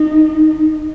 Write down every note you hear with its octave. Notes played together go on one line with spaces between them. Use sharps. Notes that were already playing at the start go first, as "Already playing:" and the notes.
Already playing: D#4